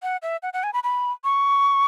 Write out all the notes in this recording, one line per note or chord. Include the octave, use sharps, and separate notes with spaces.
F#5
E5
F#5
F#5
G#5
B5
B5
C#6